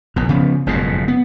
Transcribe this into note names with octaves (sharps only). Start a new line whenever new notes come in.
A#1 B2
C#3 F3 B3
F#1 F2 G#2 B2
B3